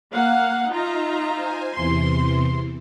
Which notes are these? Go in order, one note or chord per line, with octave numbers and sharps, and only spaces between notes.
A#3 F5 F#5
D#4 F4 E5 F5 A#5
C5 G#5
E2 C3 E3 C6